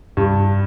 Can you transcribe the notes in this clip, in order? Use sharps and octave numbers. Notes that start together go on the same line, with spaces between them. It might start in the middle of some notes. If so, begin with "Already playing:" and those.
G2